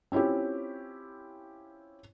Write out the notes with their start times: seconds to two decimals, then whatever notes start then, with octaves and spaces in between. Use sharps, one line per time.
0.12 C4 C#4 E4 F4 G4